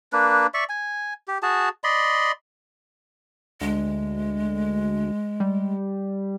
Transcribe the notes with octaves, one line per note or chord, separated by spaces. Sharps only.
A#3 D4 B4
D5 E5 C#6
G#5
G4
F#4 G#4 A5
D5 D#5 B5 C6
D2 G#3
G3